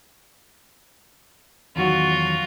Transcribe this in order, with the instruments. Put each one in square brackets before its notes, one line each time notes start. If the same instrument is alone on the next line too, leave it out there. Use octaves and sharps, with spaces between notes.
[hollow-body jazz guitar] E2 D#3 F#3 [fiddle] F4 F#4